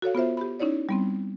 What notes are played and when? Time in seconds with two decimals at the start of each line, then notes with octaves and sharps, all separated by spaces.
0.02 F#4 A4 C#5 F5
0.15 B3 F4 C5 E5
0.37 G4 B5
0.60 C#4 D#4 E4 C#5 D5
0.89 G3 B3 C4